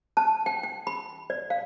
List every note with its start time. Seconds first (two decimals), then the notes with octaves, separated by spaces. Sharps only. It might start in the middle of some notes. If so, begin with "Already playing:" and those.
0.17 A5
0.46 G5
0.63 G5
0.87 B5
1.30 D5
1.50 F5